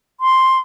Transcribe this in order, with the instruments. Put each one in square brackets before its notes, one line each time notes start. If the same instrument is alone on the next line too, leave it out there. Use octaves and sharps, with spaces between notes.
[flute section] C6